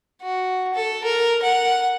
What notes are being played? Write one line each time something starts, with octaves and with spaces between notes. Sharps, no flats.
F#4
A4
A#4
F#5